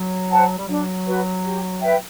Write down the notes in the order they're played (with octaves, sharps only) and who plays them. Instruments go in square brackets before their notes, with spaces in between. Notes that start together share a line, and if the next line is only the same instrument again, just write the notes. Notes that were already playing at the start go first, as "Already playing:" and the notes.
Already playing: [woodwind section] F#3
[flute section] C5 F#5 A5
[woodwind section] G3
[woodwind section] F#3 [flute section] D4
[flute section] F#4 B4
G4
B4 E5 G5